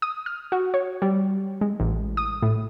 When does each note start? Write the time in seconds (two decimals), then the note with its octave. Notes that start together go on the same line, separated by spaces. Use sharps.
0.02 D#6
0.26 F6
0.52 F#4
0.74 C#5
1.02 G3
1.61 G#3
1.80 A1
2.17 D#6
2.42 A2